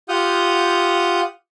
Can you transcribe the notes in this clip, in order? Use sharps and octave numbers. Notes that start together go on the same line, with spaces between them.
F4 G4 F#5 D#6 F6 G6